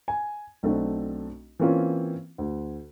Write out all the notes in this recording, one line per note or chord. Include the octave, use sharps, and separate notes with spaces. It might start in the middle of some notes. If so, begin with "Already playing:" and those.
G#5
B1 A3 C4 D4
E3 A#3 C4 C#4 F4
D2